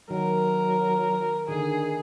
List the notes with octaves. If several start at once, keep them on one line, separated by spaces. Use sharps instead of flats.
D#3 F#3 A#4
D3 D#3 G#4